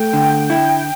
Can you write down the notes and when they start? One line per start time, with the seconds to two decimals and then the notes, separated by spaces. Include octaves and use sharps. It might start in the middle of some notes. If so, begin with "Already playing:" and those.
Already playing: A3 G5
0.13 D3
0.50 E4